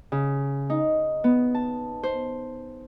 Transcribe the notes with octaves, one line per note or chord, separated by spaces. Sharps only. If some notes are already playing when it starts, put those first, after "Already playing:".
C#3
D#4
B3
A5
C5